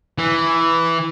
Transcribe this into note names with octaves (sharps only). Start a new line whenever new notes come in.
E3